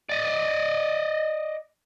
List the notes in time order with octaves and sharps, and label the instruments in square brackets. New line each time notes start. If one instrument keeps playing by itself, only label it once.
[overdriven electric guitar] D5 D#5